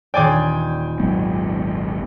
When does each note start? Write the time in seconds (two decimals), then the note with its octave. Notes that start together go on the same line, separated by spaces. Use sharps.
0.14 D#1 D5 G5 G#5 D6
0.99 G#1 F#3 B3